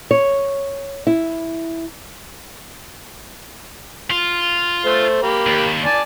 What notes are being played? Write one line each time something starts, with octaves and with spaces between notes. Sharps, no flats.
C#5
E4
F4
A3 C5
A#3 G4 B5
D#2
D5 G#5 A5